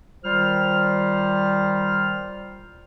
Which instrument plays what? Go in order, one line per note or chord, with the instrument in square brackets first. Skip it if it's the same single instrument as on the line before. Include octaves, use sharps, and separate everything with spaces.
[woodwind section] D#3 G3 F4 C5 F6